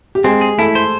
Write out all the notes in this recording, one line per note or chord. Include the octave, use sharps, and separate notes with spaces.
G4
G#3 C4 G#4
G#4
A3 E4 A4
C5